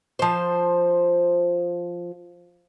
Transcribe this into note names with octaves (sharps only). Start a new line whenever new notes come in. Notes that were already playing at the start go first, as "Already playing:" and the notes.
F3 C5